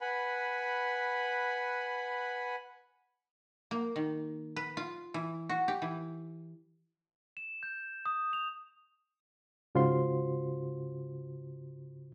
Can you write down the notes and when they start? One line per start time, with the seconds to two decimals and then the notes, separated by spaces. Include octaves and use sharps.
0.01 B4 F#5 G#5 B5
3.71 A#3
3.96 D#3
4.56 B4
4.77 F4
5.14 E3
5.49 F#4
5.68 G4
5.82 E3
7.37 E7
7.63 G6
8.06 D#6
8.33 F7
9.75 G#2 C#3 F4 F#4 C5 C6